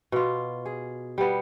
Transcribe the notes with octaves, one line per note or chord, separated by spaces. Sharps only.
B2 F4
G#4
G3 B3